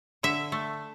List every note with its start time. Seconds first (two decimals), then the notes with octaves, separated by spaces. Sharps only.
0.23 D3 E5
0.52 A3